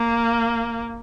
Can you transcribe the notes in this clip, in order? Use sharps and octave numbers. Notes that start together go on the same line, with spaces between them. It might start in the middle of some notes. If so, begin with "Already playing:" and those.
Already playing: A#3